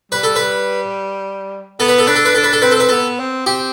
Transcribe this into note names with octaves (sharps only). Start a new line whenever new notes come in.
G3 B4
A4
B4
B3 A4
B4
A4
D4 B4
A4
B4
D4 A4
B4
A4
C4 B4
A4
B4
B3 A4
C4
C4 G4